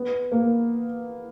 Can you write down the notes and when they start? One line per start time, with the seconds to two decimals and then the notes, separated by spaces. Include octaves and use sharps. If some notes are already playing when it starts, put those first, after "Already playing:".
Already playing: B3
0.32 A#3